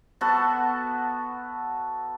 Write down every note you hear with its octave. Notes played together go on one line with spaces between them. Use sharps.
B3 F#4 A4 A5